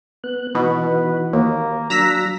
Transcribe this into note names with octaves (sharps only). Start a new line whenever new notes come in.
B3 F#6
B2 E3 D#4 F#4 B4
D#2 A#3
F#3 D4 A#5 E6 A#6 B6